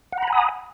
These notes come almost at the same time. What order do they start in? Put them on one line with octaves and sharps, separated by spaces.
F#5 A#5 B5 G#5 D#6